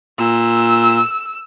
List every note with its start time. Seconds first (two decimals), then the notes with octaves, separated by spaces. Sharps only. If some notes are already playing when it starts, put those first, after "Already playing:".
0.20 A#2 E6